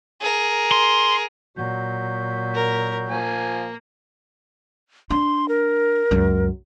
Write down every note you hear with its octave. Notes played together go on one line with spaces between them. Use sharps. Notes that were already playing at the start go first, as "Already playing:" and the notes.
G#4 A#4
C6
A#2 F#3 F#4 G6
A#4
F3 A#3 G#5
D4 C6
A#4
C#2 F#2